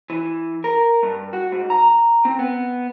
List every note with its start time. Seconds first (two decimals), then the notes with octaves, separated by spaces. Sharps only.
0.10 E3
0.64 A#4
1.03 G2
1.33 F#4
1.52 G#2
1.70 A#5
2.25 C4
2.39 B3